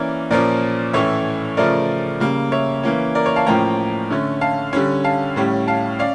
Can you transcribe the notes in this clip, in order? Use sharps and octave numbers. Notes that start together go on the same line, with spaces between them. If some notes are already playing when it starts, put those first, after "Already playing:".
Already playing: E3 A#3 C#4 A#4 D5
A#2 F3 C#4 A#4 D5
A2 E3 A3 C#4 C#5 E5
C#3 F3 A3 C#4 A#4 D5
C#3 G3 A#3
C#5 E5
E3 A#3 C#4
A#4 D5
C#5
F5 A5
A2 F3 A#3 C#4 G5 A#5
D3 A3 C#4
F5 A5
D3 G3 C#4
F5 A5
A2 G3 C#4
F5 A5
C#4 D5 F5